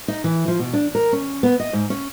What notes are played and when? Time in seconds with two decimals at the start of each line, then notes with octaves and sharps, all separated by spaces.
0.08 D#4
0.24 E3
0.48 F3
0.59 B2
0.73 D4
0.95 A#4
1.13 C#4
1.43 B3
1.60 D#5
1.73 G#2
1.90 C#4